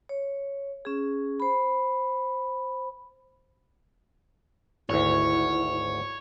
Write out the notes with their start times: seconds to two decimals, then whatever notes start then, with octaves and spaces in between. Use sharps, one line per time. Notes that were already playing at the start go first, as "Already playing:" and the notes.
0.09 C#5
0.85 C#4 G#4
1.40 C5 B5
4.90 G#1 D2 E4 C#5